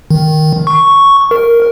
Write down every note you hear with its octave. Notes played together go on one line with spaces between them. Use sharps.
D#3
C#6
A#4